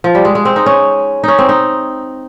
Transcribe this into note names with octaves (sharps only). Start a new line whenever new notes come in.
F3
G3
G#3
G#3
C4
D#4
C#4
C#4 D#4
C4
D#4